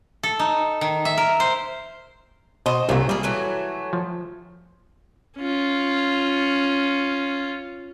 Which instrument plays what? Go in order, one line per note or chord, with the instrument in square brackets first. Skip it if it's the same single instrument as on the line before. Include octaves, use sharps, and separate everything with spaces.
[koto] A4
D#4
D#3
E5
A#4
C5
[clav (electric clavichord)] B2 [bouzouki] C5 D#5
[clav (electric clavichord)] C2 A#2 C4 [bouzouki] F#3 A3
[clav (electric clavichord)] G3 [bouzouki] A#3 G#4
[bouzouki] E3 F#3 A3
[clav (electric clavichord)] F3
[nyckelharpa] C#4 F4